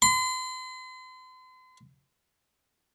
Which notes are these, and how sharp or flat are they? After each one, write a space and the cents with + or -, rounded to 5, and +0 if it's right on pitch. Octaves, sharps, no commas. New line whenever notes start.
C6 -40